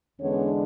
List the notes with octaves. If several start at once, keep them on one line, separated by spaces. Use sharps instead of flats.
E2 D3 G#3 B3 C#4 D4 C#5